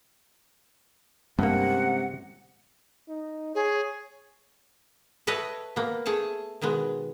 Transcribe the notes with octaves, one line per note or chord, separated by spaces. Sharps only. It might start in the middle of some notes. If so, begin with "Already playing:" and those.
G2 C3 G#3 A#3 B3 C#4 F#5
D#4
G#4 C#5
A4 B4 C#5 D#5 E5 G5
A#3 B3
A3 G#4 A4 A5
B2 D#3 G#3 B3